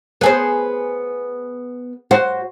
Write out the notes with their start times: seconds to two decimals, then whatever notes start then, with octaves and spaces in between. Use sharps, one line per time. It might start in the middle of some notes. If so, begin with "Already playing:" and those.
0.21 B3 G#4 C5
2.11 F#4 C5